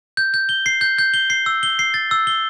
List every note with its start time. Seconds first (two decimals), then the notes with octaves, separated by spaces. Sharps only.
0.17 G6
0.34 G6
0.49 G7
0.66 C7
0.81 G6
0.98 G6
1.14 G7
1.30 C7
1.46 E6
1.63 G7
1.79 C7
1.94 A6
2.11 E6
2.27 G7